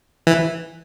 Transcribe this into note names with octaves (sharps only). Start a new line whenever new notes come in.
E3